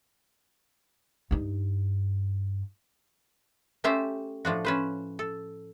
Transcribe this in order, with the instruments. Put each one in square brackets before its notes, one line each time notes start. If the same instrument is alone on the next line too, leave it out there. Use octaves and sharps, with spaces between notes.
[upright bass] G2 D#4
[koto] A3 C#4 G4 C5 E5 A5
A2 F3 D4 F#4
C#4 B4 C5
A4